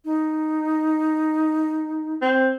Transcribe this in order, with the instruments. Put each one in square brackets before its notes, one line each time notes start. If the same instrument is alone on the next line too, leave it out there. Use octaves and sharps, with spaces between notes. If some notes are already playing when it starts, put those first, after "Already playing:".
[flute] D#4
[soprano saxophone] C4